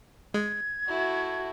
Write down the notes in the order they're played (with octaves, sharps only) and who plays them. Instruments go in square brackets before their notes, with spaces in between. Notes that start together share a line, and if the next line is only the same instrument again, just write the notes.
[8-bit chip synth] G#3 [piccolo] G#6
[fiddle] A3 E4 [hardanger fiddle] F#4